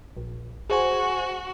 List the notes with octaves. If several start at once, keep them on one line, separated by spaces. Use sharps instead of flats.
A#1
F#4 G#4 C5 G#5